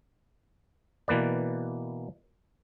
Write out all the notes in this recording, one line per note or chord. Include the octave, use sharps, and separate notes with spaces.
B2 E3 A#3 B4 D5